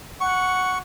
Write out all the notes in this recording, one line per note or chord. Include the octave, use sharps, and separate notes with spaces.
F#5 C#6